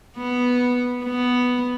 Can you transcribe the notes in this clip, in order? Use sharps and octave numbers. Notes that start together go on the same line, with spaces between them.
B3
B3